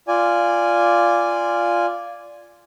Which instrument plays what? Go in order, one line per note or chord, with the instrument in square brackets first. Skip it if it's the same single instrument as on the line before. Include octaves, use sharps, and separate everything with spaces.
[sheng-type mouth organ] F4 D5 G#5